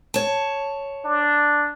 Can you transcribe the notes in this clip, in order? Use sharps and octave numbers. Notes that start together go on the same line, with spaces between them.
C#5 A5
D4